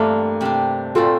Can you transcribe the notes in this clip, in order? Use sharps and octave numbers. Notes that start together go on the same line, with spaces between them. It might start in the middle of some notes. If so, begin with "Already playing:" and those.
Already playing: G2 E3 A3 A#3 C4 D4
C3 G3 D4
A#2 A3 C4 F4 A4